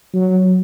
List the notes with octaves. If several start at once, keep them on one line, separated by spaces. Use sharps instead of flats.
F#3